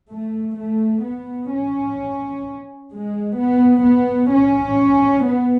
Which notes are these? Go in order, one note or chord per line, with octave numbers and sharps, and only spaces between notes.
A3
A3
B3
C#4
G#3
B3
B3
C#4
B3